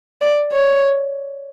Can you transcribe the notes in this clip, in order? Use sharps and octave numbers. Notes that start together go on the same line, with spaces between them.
D5
C#5